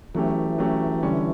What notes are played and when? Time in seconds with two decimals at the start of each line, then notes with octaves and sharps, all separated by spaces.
0.14 E3 F#3 A3 C#4 G4
0.58 F#3 A3 C#4 G4
1.03 D3 G3 C#4